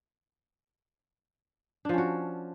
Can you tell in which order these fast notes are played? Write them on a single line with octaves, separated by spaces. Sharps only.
D4 F3 C#4 F#4